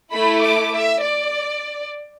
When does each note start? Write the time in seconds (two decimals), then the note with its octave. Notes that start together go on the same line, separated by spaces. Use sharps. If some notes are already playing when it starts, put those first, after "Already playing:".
0.14 A3 E4 A4 B5
0.43 D6
0.74 E5
1.04 D5